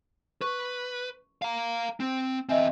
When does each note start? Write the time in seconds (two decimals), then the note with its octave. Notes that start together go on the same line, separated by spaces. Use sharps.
0.41 B4 C#6
1.42 F5 A#5
2.00 C4
2.49 E2 C4 D#5 E5 G#5